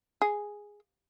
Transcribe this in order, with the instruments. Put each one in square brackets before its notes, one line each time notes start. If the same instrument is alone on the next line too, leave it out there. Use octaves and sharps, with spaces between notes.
[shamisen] G#4